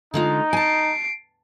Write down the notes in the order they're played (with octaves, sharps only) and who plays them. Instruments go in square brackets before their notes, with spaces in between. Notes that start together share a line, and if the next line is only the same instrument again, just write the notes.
[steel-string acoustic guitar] D3 G#3 F4 [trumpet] D#4
[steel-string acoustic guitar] G#5 A5 [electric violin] C7 D7